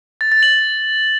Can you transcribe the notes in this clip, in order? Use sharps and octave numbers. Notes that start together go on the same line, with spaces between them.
A6
A6
F#7